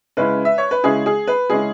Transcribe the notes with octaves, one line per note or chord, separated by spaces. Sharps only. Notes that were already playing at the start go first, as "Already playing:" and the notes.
C#3 G#3 C#4 E4 B4
E5
C#5
B4
C#3 G#3 C#4 E4 G#4
G#4
B4
C#3 G#3 C#4 E4 G#4